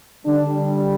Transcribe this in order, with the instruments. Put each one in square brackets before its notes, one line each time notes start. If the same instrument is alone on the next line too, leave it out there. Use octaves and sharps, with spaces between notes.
[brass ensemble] D3 G3 D4